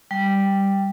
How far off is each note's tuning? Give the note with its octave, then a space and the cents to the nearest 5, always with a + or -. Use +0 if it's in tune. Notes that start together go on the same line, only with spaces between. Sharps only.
G3 +0 G5 +0